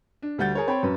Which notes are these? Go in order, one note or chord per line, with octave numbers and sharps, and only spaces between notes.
D4
D2 G3 F#5 G6 A6
G#4 A#4 C#5
C4 C#5 G5 B5
F#2 B4